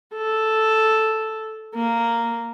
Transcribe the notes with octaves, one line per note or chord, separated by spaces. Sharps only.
A4
A#3